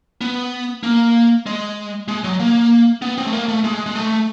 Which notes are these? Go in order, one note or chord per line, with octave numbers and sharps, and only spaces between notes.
B3
A#3
G#3
G#3
F#3
A#3
B3
C4
A3
A#3
A3
G#3
G#3
A3